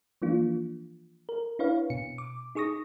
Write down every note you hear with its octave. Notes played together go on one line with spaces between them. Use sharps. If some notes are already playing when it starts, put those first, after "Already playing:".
E3 F3 A#3 D4 F4
A#4
D4 E4 B4 C#5 F5
B2 C#7
D6
D#4 G#4 C#6 D#6 A#6